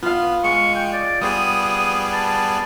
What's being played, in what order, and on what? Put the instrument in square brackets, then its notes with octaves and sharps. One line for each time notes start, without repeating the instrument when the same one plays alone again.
[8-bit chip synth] B3 [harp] F4 F5
[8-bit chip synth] G#3 [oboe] C#6
[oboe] G5
D5
[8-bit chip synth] G3 B3 G#4 [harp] C5 [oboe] D#6
[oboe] A5